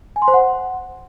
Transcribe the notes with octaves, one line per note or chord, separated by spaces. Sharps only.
G#5
C6
C5
F#5